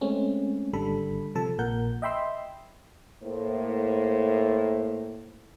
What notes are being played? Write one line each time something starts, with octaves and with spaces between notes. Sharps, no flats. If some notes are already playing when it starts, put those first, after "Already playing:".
G#3 A3 C4 C#4
G#1 D3 G3 A4 B5
C3 F3 A4 A5
A#1 A#2 A#4 F#5 G6
D#5 E5 G5 B5 C6 E6
A2 A#3 C5